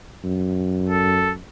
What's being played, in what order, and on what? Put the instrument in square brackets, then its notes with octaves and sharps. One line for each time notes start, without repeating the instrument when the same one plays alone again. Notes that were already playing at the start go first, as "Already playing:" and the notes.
[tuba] F#2
[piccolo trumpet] A4